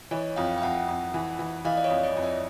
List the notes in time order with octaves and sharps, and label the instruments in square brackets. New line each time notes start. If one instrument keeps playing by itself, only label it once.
[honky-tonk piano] E3 [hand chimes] C#5 D#5
[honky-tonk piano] F2 [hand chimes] F5 G5
[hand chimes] G5
[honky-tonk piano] F2 [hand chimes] E5 F#5
[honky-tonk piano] F2
E3
E3
[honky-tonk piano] E3 [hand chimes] D#5 F5
[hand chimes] D5
C#5 D#5
[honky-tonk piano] F2
[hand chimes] C#5 D#5
[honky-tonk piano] F2
[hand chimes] D5 E5